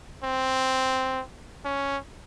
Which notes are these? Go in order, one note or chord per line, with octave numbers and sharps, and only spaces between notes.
C4
C#4